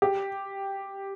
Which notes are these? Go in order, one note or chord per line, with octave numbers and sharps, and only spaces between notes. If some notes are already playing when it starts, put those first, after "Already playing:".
G4